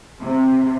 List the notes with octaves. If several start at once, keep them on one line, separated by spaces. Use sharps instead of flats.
C3